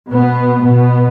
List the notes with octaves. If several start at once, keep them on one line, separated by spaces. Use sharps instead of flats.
B2 B3
B2 B3